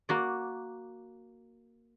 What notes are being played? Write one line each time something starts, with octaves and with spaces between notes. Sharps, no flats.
A#3 F#4 D5